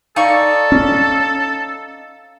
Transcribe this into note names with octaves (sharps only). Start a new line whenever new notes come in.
D#4 A4 D5 F5 C#6
C#4